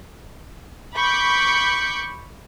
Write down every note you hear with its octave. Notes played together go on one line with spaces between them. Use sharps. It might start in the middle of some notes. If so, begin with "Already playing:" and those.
B5 C#6 D6 G6